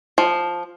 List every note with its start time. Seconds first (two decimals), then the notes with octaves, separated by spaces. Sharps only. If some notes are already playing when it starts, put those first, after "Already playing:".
0.18 F3